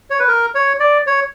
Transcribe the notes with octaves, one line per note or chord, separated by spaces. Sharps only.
C#5
B4
A#4
C#5
D5
C#5